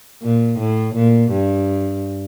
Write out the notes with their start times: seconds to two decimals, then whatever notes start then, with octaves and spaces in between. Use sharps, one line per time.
0.23 A#2
0.60 A2
0.96 A#2
1.32 G2